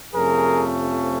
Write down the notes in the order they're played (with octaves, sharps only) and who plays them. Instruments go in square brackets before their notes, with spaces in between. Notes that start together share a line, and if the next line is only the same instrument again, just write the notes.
[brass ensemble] F2 C3 F3 A3 C#4 G#4 A#4